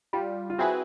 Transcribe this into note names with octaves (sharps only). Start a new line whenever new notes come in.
G3 F4
F4
C4 E4 F#4 G#4 B4